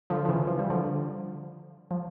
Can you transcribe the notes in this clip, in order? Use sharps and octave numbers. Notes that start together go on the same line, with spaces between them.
D3 F3
F3
C#3 E3
F3
G3
D3 F3
F3